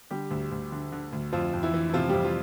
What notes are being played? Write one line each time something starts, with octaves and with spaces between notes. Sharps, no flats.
D3 G3 G4
D2
D2
D3
D3
D2
F2 F3 F4
F2
E3 E4
E3
E4
C3 F3 F4
F2 G3 G4
F3 F4